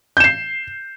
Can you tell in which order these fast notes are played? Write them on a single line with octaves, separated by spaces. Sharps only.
G6 E7 C7